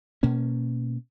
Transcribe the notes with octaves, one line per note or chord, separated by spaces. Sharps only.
B2 A#3 C#4